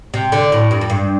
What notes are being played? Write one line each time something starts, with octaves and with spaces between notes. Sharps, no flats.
C3
D3
A2
G2
F2
G2